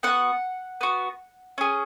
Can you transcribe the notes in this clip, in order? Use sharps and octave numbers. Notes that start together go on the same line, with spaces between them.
B3 F#4 F#5
B3 F#4
C#4 G#4